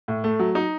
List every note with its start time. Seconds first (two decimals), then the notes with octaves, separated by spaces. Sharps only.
0.08 A2
0.24 A3
0.40 F#3
0.55 D#4